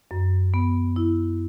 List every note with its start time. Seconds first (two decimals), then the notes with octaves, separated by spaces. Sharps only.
0.11 F#2
0.54 B3
0.96 E4